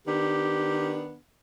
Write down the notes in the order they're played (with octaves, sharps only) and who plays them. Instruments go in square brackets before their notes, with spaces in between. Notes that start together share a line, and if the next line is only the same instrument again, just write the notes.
[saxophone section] D#3 B3 D4 [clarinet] G4